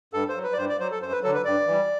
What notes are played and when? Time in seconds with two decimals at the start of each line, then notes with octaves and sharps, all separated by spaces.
0.13 G2 A4
0.29 C5
0.36 F#3
0.43 B4
0.53 D5
0.58 G2 C5
0.69 D5
0.79 F#3 C5
0.91 A4
1.02 F#2 C5
1.12 B4
1.23 D3 F#3 A4
1.34 B4
1.45 G2 D5
1.67 E3 G3